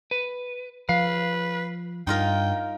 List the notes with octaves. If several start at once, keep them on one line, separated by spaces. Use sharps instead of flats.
B4
F3 B4 F5
G2 D#4 F4 A#4 G5